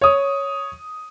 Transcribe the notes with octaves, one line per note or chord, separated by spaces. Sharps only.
C#5 D#6